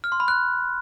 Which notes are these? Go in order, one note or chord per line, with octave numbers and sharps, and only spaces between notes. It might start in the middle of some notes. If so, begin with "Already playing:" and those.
F6
C6
B5
F#6